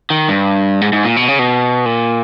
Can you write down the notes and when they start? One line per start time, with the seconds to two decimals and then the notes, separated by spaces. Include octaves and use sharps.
0.10 D#3
0.28 G2
0.81 G#2
0.93 G#2
1.05 A#2
1.16 B2
1.28 C#3
1.39 B2
1.86 A#2